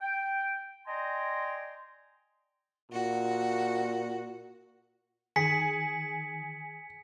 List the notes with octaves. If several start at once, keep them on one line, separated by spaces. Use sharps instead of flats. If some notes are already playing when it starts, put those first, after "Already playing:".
G5
D5 D#5 G5 G#5 A#5 C6
A#2 F#4
D#3 G#4 B6 C#7